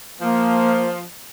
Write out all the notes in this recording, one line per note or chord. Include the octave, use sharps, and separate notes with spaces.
F3 A#3